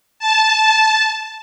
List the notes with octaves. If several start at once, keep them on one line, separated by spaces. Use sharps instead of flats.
A5